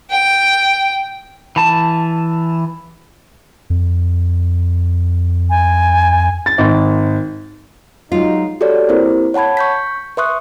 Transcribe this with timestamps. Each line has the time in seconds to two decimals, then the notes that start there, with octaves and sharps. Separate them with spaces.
0.10 G5
1.56 E3 A5
3.70 F2
5.50 G#5
6.46 A6
6.58 G#1
8.12 F#3 G#3 D#4 F4
8.61 F#4 G4 A4 C#5 D5
8.89 A#3 C4 E4 G4 A#4 C5
9.34 C#5 F#5 A5 B5 G#6
9.57 C#6 G6 B6
10.17 B4 E5 C6 C#6 D#6 F#6